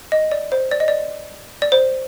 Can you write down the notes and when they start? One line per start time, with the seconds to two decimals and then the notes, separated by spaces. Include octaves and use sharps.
0.12 D#5
0.31 D5
0.52 C5
0.71 D5
0.80 D#5
0.88 D5
1.62 D5
1.72 C5